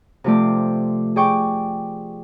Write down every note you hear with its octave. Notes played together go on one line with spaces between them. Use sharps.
C3 F3 A3 D5
G#4 D5 G5 C#6